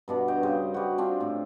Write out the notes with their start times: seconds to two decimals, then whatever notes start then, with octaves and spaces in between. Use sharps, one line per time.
0.08 G2 B2 D4 D5
0.28 C#5 D#5 G5
0.43 G2 C#3 C5
0.74 G3 F#4
0.98 C4 D4 F4
1.20 A2